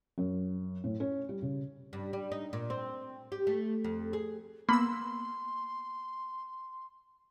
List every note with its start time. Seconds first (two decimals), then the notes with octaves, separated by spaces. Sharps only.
0.18 F#2
0.84 A2
1.00 C#4
1.29 G3
1.42 C#3
1.93 G2
2.13 G3
2.32 D#4
2.53 A#2
2.70 C4
3.32 G4
3.47 A3
3.84 F2
4.13 G#4
4.69 A#3 B3 B5 C6 E6